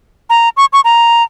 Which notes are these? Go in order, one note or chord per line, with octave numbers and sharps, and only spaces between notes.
A#5
C#6
C#6
A#5